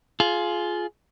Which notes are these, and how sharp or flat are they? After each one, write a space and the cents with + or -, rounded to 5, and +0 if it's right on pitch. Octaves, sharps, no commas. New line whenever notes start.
F4 +0 G#4 +25